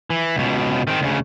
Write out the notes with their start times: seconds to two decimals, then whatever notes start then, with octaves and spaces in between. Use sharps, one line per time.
0.10 E3
0.36 C#2 B2
0.87 D#3 C4
1.02 D2 C#3